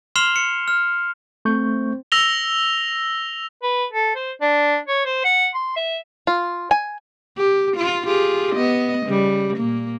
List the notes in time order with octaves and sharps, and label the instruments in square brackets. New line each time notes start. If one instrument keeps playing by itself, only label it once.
[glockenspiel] C6 F6 C7 E7 F7 G7
C#7
F6
[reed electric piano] A3 C#6 G6 [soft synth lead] C4
[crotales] E6 A#6 F7 G7
[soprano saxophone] B4
A4
C5
D4
C#5
C5
F#5
C6
E5
[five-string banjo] F4
G#5
[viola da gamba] G4
F4
F4 G4 G#4
B3 D#5
C#3 G3
A#2 A#3